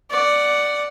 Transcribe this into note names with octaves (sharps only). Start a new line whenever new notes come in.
D5 F#5